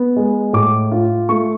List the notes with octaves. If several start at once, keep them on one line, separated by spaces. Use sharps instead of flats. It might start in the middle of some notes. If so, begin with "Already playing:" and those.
Already playing: B3
G#3
A2 D6
F4
A3 C#6